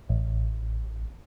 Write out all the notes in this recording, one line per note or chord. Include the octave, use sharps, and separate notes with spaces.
A1